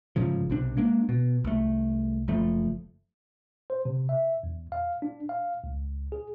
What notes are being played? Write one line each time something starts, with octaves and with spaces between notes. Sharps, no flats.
G1 G#2 C#3 F3
B1 C3 D4
G#3 A#3 D4
B2
C2 A3
F#1 F3 A3
C5
C3
E5
E2
F5
D4
F5
C#2
G#4